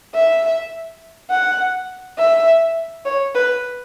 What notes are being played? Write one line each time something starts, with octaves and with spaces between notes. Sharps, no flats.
E5
F#5
E5
C#5
B4